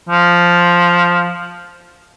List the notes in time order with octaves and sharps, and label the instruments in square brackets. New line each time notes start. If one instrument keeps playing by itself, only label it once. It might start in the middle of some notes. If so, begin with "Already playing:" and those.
[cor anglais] F3